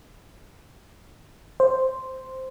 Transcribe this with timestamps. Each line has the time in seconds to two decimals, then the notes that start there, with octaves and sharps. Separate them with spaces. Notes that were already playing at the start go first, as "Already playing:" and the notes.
1.60 C5